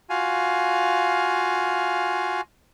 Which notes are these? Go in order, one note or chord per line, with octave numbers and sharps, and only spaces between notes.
F4 F#4 F5 G#5